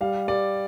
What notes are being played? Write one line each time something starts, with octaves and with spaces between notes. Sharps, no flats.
G3 F5
G3 D5